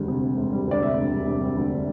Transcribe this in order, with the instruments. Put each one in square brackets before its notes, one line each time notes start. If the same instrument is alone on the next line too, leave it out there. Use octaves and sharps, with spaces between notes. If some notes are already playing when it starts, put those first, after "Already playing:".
Already playing: [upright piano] E1 D2 G3
C3
E1
E1
G3
D2 D5
C3 E5
E1
G3
C3
G3
D2